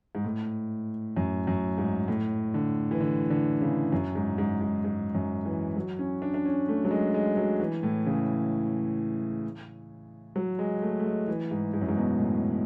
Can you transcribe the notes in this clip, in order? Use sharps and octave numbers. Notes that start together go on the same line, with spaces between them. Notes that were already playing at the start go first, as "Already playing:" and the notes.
G#2
A2
F#2
F#2
G#2
A2
D3
E3
D3
D3
C#3
F#2
G#2
G#2
G#2
G#2
F#2
E3
F#3
C#4
D4
D4
C#4
A3
F#3
G#3
G#3
F#3
E3
A2
C#3
F#3
G#3
A3
A3
G#3
E3
G#2
G#2
F#2
G#2
B2
A2